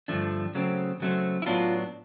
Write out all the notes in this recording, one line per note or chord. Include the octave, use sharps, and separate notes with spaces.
G2 D3 F3 A3 D4
C#3 F#3 A3 C4
C#3 F#3 A3 C4
E4
A2 F#3 B3 D4 F4